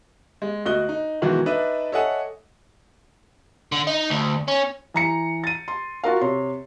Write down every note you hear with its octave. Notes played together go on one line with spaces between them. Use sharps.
G#3
D2 F#4 D#5 F#6 G7
D#4
B2 D#3 E3 F#3 G#3 F#4
D4 D#4 B4 D#5 E5
A4 C#5 D#5 E5 F#5 G#5
D3
D#4
D2
C#4
E3 A#5 C#7
A6 D#7
C6
F4 F#4 A#4 F5
C3 C#5 C6